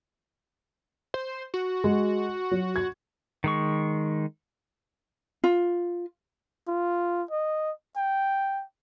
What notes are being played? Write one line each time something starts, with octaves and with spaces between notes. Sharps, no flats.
C5
F#4
G#3
F#3
G#6
D#3 G#3 C#6
F4
F4
D#5
G5